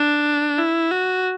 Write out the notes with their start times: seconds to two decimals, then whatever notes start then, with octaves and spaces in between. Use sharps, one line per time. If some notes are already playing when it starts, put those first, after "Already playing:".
Already playing: D4
0.58 E4
0.91 F#4